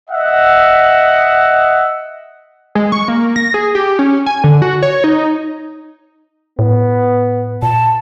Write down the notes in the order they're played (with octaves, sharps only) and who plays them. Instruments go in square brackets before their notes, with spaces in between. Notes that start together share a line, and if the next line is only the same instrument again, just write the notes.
[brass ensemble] D#5 E5 F#5
[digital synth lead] G#3
C#6
A#3
A#6
G#4
G4
C#4
G#5
D3
F#4
C#5
D#4
[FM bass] A2 [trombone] B3
[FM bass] A#2 [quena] A5